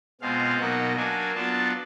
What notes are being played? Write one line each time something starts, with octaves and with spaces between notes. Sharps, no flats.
B2 G#3 C4 F4 F5
B2 F#3 A#3 D#4 F#5
F#3 A#3 D4 G#5
F#3 B3 D4 F4 A5